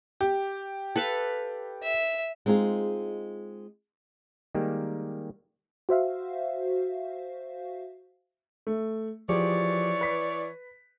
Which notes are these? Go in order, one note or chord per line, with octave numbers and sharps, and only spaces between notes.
G4
A4 B4 F5
E5
G#3 C4 D#4 F4 G#4
D#3 G3 G#3 A#3 G4
F#4 C5 E5 F5
A3
E3 F3 G4 G#4 C#5 D5
B4 B6